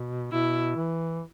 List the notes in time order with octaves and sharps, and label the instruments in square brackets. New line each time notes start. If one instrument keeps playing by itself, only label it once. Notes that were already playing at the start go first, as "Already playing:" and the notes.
Already playing: [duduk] B2
[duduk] B2 [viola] E4
[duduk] E3